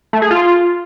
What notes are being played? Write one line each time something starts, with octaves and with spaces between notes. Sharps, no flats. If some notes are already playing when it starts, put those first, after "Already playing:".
A3
G#4
F4